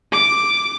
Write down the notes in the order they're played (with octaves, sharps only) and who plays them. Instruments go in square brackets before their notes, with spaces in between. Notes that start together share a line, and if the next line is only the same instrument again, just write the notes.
[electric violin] D6